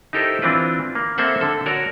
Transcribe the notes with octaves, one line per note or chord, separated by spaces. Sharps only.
D#4 E4 G4 A4 A#4 C5
E3 C4 D4 F4 B4
A#3
A#3 C4 A4 C5 E5 F#5
D3 A4
F#4 A#4 C#5 D5